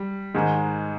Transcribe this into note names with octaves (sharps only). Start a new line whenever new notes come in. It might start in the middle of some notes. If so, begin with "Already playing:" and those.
Already playing: G3
G#2 D#3 G#3